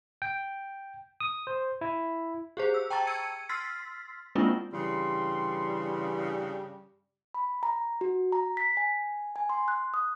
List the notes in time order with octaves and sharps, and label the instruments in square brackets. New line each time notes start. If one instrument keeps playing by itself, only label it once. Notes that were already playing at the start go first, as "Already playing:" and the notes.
[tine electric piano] G5
D#6
C5
E4
[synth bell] G4 G#4 C5
E6
G5 A5 A#5 C#6 A6
E6 G#6 C#7 D#7
C6 E6 F6 A6 B6 C7
G#3 A#3 C4 D4 E4 F4
[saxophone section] G2 C#3 G3 [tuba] E3 [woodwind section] C6
[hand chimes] B5
A#5
F#4
A#5
B6
G#5
G#5
C6
F#6
D#6